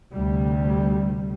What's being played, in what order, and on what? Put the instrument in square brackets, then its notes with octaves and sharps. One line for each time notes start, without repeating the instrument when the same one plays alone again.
[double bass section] D2 C3 G3